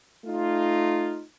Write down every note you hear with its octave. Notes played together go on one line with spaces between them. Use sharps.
A3 D#4 F4